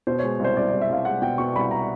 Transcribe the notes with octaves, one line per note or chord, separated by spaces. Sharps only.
B2 C5
G#3 C#5
C2
C5
C2 D5
C2 D5
E5
C2 F5
G#3 F#5
B2 G5
B2 C#6
C2 B5
A#5